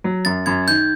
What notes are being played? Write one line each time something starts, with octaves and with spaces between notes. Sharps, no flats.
F#3
F#2 A6
F#2 G#6
D#3 G6